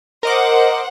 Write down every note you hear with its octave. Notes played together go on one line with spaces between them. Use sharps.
A#4 C5 D#5 F#5 D6